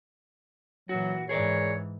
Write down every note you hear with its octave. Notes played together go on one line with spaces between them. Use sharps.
A#2 E3 F#3 F#4
G#2 E3 G#4 A#4 C#5 D5